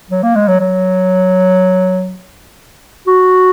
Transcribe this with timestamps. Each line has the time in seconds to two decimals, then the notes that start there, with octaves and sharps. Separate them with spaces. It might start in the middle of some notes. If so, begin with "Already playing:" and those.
0.10 F#3
0.23 A#3
0.36 G#3
0.48 F#3
0.60 F#3
3.07 F#4